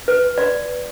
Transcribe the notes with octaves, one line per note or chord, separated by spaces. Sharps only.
B4
D5